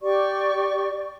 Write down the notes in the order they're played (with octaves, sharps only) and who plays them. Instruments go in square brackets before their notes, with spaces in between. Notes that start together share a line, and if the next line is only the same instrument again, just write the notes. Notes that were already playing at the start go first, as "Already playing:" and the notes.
[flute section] G4 D5 C#6